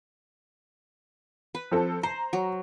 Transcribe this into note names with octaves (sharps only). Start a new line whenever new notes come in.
B4
F3 C4 A4
C5 A#5
F#3